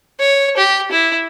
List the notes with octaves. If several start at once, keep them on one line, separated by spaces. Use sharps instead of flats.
C#5
G4
E4